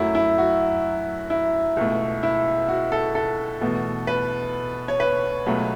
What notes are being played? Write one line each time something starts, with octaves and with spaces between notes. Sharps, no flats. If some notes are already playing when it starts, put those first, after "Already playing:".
Already playing: F#2 F#3 A3 E4
E4
F#4
E4
C#2 B2 A3
E4
F#4
A4
A4
E2 B2 A3
B4
C#5
B4
C#2 B2 F#3 A3